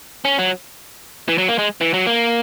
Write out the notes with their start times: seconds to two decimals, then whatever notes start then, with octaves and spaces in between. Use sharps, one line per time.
0.25 C#4
0.39 F#3
1.28 E3
1.38 F#3
1.48 A#3
1.59 G#3
1.81 E3
1.94 F#3
2.06 A#3